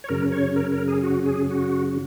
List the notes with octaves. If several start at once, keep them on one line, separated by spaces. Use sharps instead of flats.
C#5
F#2 C#3 A#4
C#5
A#4
A#4
G#4
F#4
G#4
F#4